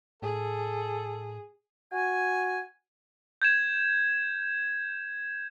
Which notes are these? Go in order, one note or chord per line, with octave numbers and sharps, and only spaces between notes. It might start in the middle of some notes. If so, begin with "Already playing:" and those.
A2 G#4 A4
F#4 G#5
G6 G#6 E7